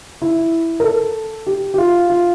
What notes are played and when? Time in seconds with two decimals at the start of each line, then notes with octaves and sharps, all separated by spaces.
0.22 E4
0.80 A#4
0.84 A4
1.47 G4
1.74 G4
1.78 F4
2.10 F4